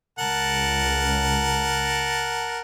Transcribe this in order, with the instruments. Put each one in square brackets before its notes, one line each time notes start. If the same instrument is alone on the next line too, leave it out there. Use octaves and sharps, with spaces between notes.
[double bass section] C#2 [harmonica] A#4 F#5 A5